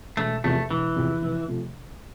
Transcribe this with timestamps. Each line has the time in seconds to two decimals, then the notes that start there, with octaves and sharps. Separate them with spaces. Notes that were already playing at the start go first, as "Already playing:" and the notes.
0.17 E1 A3
0.44 E2 C3 F3 A3
0.70 E1 E3
0.96 E2 C3 F3
1.21 F1
1.48 C3 F3 A3